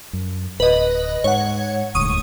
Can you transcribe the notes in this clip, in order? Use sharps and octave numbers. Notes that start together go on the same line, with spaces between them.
F#2
D1 B4 D#5
G#2 C#5 F#5
D#1 D2 G#2 C#6 D#6 D#7